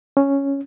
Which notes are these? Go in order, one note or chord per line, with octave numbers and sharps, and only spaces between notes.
C#4